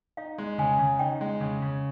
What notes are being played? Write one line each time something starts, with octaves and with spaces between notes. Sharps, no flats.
D#4 F5
G#3
C#3 G#5
C#3
D#4 G5
G#3
C#3
C#3